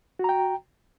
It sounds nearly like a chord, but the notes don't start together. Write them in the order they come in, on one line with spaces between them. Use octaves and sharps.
F#4 A#5 G5